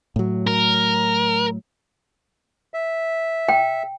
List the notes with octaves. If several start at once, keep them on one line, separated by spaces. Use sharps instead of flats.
A2 F#3
A#4
E5
G5